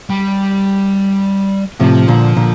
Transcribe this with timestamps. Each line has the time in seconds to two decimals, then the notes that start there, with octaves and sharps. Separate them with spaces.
0.10 G3
1.80 A2 C3 F3
2.08 A#2 D3
2.37 A#2 D3